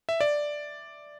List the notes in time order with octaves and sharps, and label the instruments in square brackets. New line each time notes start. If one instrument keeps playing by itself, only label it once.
[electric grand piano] E5
D5